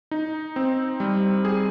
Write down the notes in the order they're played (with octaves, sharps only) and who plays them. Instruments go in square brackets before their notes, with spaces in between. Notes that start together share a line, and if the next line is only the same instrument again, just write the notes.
[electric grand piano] D#4
C4
G3
G#4